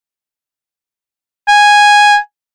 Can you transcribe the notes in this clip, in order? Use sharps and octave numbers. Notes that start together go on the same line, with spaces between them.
G#5